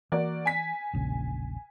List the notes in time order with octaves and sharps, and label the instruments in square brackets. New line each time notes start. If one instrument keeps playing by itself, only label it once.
[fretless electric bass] E3 [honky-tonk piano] A#3 F#4 D5
[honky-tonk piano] G#5 B6
[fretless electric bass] E1 A#1 C#3